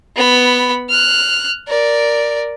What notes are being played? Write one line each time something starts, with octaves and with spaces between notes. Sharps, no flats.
B3 B5
F6 F#6
A#4 D5